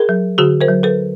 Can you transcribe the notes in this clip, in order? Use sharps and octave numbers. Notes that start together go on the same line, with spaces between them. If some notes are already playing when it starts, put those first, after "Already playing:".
Already playing: G#4 A#4
F#3
D3 F#4 G#4
A#4 C5
F#3
A4 B4